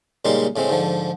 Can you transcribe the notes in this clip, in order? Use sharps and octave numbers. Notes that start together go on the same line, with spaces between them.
A#2 C#3 G3 G#3 D#4 C6
A2 C#3 G#3 C4
G#2 D3 F3